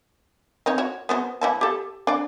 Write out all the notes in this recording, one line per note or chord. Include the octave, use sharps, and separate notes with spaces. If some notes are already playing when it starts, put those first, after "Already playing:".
C4 D#4 C#5
F#4 C#5
B3 F#4 C5
E3 E4 A5
G4 A4
D4 D5